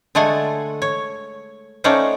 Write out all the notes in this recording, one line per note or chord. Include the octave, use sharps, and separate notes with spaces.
D3 G#3 A3 A4 F#5 G#5
C#5
A3 C#4 D#4 C5 D5 F#5